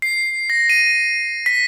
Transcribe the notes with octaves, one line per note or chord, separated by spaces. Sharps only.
C7
A#6
D#7
B6